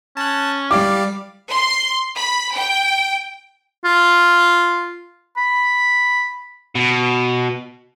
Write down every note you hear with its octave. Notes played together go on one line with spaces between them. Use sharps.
C#4 A5 F#6
G3 G4 D5 F5 D6
C6
B5
G5
F4
B5
B2